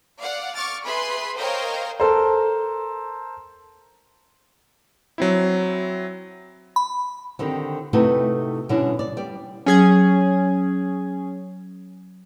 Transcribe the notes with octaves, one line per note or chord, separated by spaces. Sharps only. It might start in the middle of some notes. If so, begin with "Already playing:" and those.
D5 F5 F#5
C#6 D6 F6 A6
G#4 B4 E5 B5 C6
A#4 C5 C#5 D#5 F5 G5
A4 A#4 C5
F#3 C4 E4
B5
D3 D#3 C4 G4
C3 A3 D#4 E4 F#4 B4
B2 D3 G3 C#4 D4 E4
D5
G3 D5
F#3 C#4 G#4 G#6